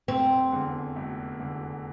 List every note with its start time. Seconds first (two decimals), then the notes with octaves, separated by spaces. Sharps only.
0.08 F1 C4
0.52 E2 D3
0.96 F1
1.40 E2 D3